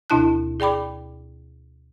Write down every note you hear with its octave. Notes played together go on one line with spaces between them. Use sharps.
D2 B2 D4 E4 A5 F#6
G#4 D5 G5 B5 D6